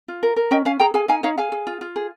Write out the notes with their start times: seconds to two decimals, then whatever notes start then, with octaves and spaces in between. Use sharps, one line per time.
0.08 F4
0.23 A#4
0.36 A#4
0.51 C#4 D#5 G5
0.65 C#4 F5 G#5
0.79 G#4 G5 A#5
0.94 G#4 F5 G#5
1.08 D#4 F5 G#5
1.23 D#4 C#5 F5
1.38 G#4 F5 G#5
1.52 G#4
1.67 F4
1.81 F4
1.96 G#4